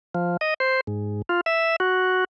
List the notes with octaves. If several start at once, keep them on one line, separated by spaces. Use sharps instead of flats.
F3
D#5
C5
G#2
F4
E5
F#4